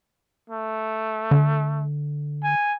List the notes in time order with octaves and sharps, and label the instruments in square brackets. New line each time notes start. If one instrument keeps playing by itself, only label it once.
[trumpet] A3
[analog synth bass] D3
[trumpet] G#5